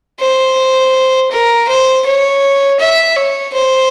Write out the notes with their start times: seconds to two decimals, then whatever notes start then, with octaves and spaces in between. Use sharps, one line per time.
0.20 C5
1.31 A#4
1.69 C5
2.06 C#5
2.80 E5
3.16 C#5
3.54 C5